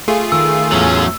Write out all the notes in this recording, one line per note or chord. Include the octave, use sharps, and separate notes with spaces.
A3 F4 G#4
D#3 E6
E2 A2 F#3 B3 C#4